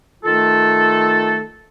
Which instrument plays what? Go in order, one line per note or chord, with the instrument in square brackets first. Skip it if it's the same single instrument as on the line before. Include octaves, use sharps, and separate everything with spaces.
[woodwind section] D#3 A3 F4 A4